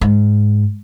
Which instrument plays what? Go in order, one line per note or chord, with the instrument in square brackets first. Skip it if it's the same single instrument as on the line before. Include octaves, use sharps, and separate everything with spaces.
[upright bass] G#2